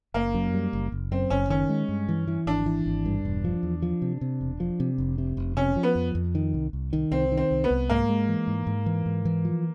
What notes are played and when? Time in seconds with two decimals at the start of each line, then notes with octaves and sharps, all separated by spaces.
0.14 F#1 A#3
0.34 F#2
0.54 G3
0.73 F#1
0.92 F#1
1.12 F#2 C4
1.30 F#1 C#4
1.50 D#3 C#4
1.69 G#3
1.89 G2
2.09 E3
2.27 E3
2.47 G#1 D4
2.66 E3
2.86 G#1
3.06 G2
3.25 E1
3.45 F3
3.63 E2
3.82 F3
4.02 C3
4.21 C3
4.41 E1
4.60 F3
4.80 C3
4.98 F1
5.18 C3
5.37 F1
5.57 C3 C#4
5.76 F3
5.83 B3
5.95 F2
6.15 F2
6.35 D#3
6.54 C2
6.73 C2
6.93 D#3
7.11 C2 C4
7.32 D#3
7.37 C4
7.51 C2
7.64 B3
7.71 C2
7.90 G#2 A#3
8.09 G#3
8.28 E3
8.47 G#2
8.67 G#2
8.86 E3
9.06 G#2
9.25 E3
9.45 F3